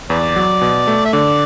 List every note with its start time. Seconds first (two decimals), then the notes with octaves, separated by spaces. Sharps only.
0.10 E2 B4 D5
0.36 F#3
0.61 B2
0.87 A3
1.05 E5
1.13 D3 D5